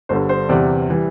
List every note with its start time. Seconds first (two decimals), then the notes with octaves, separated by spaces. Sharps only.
0.09 G1 G2 D3 G3 C5
0.29 C5
0.49 E2 C3 E3 G3 D5
0.89 E3 G3